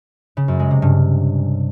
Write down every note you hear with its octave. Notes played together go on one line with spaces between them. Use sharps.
C#3
F#2
G#3
C3
G2